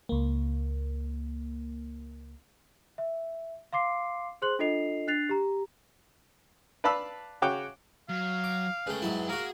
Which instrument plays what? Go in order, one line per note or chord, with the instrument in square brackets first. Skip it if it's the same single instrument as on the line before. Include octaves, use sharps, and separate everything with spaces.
[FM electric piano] C#2 A#3
[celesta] E5
F5 C6 D6 C7
G#4 C5 C6 F#6 F#7
D4 F4 A4 D#5 C7 F7
D4 F#6 A6 C7 F7
G4 A#5
[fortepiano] B4 D5 F5 A5 B5 E6
C#3 F#4 C#5 G5 D6
[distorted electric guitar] F#3 [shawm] F5
[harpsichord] D6
[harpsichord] C#3 A3 [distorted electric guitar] B4 G5
[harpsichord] G#2 F#3 E4
[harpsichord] A#3 F#4 [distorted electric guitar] G#4 [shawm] A#4